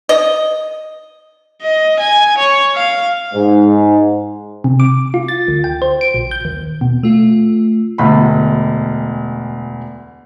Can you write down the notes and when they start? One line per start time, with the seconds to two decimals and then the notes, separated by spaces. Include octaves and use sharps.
0.09 D#5
1.62 D#5
1.99 G#5
2.38 C#5
2.75 F5
3.33 G#2
4.64 C3
4.80 D6
5.14 F4
5.28 A6
5.48 D2
5.64 G5
5.82 C5
6.01 D7
6.14 A#1
6.31 G6
6.45 D#2
6.81 B2
7.03 A3 F4
7.98 E1 D2 B5